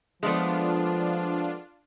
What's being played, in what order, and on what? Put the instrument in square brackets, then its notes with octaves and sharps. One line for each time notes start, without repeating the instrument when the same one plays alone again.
[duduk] F3 [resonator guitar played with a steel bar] G#3 A3 B3 [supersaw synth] D4 F4